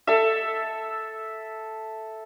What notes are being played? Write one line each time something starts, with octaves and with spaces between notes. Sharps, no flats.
A4 E5